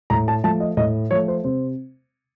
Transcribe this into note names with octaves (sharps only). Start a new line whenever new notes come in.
A2 A#5
A5
F3 A3 A5
D#5
A2 D#5
F3 A3 C#5
C5
C3 C5